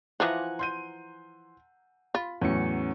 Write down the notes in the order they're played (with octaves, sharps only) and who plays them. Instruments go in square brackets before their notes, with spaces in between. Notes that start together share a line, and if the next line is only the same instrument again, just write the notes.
[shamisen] E3 F3 F4 [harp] F#5 G#5 A#5
[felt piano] C6 G6 D#7
[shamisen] F4 [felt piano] B5
[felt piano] E2 A2 F#3 [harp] C#4 C#7